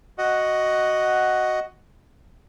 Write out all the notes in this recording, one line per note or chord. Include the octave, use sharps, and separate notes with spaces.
F#4 D#5 F#5